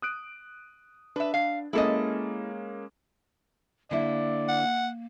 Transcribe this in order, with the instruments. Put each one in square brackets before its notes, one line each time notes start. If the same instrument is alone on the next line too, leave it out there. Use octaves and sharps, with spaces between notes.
[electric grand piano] D#6 F#6 D7
[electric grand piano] D4 [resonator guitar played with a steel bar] B4 E5
[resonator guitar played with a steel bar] F5
[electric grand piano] G#3 A#3 C#4 [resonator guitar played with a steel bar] E4 A4 D#5
[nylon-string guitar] D3 E4 [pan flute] A#3 [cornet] D5
[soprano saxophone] F#5